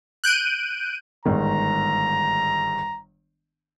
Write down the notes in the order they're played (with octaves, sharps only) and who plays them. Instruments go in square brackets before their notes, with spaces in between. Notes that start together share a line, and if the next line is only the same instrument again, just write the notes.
[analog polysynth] F#6 G6 D7 D#7
[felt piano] G1 G#2 D#3 [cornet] A#5